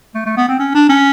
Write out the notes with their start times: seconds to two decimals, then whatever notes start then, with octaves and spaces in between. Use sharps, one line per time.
0.15 A3
0.26 A3
0.37 B3
0.48 C4
0.59 C#4
0.74 D4
0.89 C#4